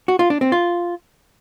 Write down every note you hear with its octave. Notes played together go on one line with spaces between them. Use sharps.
F#4
F4
D4
C4
F4